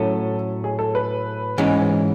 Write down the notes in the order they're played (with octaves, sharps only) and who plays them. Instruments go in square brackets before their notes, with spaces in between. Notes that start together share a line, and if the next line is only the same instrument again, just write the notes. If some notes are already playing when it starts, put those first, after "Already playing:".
Already playing: [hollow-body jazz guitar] A2 F#3 C#4 [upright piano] A4
[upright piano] G#4
A4
B4
[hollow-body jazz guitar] G#2 E3 G#3 C#4